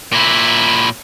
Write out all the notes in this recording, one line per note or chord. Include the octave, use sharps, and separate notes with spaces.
A#2 E4